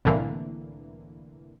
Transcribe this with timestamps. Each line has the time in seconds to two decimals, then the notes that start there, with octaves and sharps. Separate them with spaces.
0.05 C2 A2 D3 E3 A#3